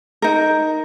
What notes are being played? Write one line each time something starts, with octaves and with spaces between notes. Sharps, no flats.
D#4 A#4